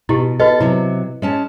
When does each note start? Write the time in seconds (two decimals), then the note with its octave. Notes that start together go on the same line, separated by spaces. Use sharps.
0.09 B2 E4 G4
0.40 F#4 A4 B4 D#5
0.60 C3 F#3 E4
1.22 G#3 C#4 A5